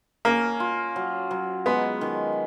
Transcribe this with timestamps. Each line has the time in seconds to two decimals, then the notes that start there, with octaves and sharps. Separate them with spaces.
0.25 A#3 C#4
0.60 F4
0.96 F#3
1.31 F#3
1.66 G#3 B3
2.01 D#3